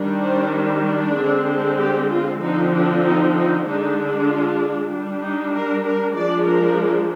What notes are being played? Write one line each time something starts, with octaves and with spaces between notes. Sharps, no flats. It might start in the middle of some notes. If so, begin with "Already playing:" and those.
Already playing: D#3 G3 D4
C5
D4
D3 G#3 C4
G4
F4
D3 F3 C4 D#4
D4
D#4
D#4
D3 G#3 D4 D#4
F4
G3 D4
D#4
A#4
A#4
F3 G#3 D4 D5
A#4